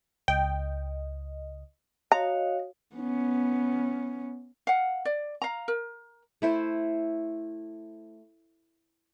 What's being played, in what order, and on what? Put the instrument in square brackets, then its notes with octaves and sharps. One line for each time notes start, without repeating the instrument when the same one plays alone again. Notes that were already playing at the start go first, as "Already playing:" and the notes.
[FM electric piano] C#2 D#5 [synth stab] G5
[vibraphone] F#4 C#5 F5 [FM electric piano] D#5 [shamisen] A#5
[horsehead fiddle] B3 C#4
[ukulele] F5 F#5
D5
F5 A#5
A#4
[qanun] A3 E4 C5